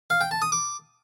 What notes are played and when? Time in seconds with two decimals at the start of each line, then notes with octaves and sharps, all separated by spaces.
0.10 F5
0.21 G5
0.31 A5
0.42 D#6
0.52 D6